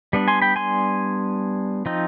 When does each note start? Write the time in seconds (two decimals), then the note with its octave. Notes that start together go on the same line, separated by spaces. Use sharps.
0.13 G3 B3 D4
0.28 G#5 C6
0.42 G5 B5
0.56 G#5 C6
1.86 F3 C4 D#4